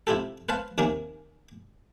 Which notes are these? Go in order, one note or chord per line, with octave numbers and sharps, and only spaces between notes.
C3 E4 F4 G4 A4
B4 C5 F5 A5
D#2 C3 D#3 A#3 C#4